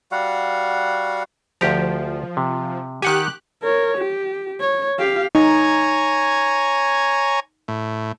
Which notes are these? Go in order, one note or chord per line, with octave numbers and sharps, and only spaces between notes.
G3 F#4 F5 F#5
D2 F3 G4 A#5
C3
D#3 G4 F#5 G#5 F#6
A#4 C#5
G4
C#5
G4 F5
D#4 C#5 G#5 A#5
A2